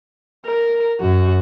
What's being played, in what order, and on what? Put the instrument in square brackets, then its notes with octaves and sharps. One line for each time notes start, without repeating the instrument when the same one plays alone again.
[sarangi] A#4
[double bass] F#2 [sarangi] F#4